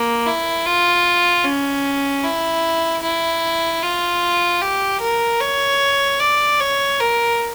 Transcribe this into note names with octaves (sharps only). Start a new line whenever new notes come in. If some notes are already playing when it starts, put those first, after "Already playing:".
Already playing: A#3
E4
F4
C#4
E4
E4
F4
G4
A#4
C#5
D5
C#5
A#4